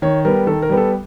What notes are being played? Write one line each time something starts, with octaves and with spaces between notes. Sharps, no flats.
D#3 C#5
G3 B3 A#4
D#3 A4
A#4
G3 B3
A4